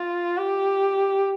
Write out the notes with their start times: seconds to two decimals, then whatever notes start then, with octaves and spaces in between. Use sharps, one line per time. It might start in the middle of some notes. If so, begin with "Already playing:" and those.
Already playing: F4
0.37 G4